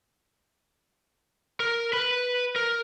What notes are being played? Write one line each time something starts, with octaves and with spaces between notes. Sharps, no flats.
A#4
B4 B5
A#4